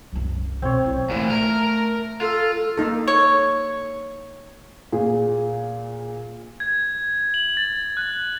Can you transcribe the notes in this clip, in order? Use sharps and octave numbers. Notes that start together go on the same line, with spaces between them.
C2 F#2
B2 C4 C#5
B1 E4
A#2 E3 A3
A#4 A#5
F4 A4
A#3 D#4 A4
C#5
A#2 G#4
G#6
F#7
A6
F#6